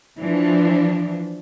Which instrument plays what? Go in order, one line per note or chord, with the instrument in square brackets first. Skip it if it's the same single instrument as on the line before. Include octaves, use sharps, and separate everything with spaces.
[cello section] E3 F3 D4